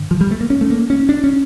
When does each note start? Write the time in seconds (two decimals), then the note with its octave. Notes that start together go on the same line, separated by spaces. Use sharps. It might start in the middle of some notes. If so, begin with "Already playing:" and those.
Already playing: G2 D3
0.11 F3
0.21 G3
0.31 A3
0.41 A#3
0.50 C#4
0.61 A3
0.70 A#3
0.90 C#4
1.09 D4
1.24 C#4